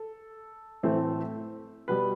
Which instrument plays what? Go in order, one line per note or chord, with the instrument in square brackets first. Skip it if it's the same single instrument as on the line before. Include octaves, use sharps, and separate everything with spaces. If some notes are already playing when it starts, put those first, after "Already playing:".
Already playing: [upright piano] A4
A2 E3 A3 C4
B2 G3 B3 B4